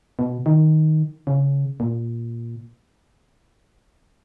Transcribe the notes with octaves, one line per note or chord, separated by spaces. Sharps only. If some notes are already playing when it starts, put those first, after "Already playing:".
B2
D#3
C#3
A#2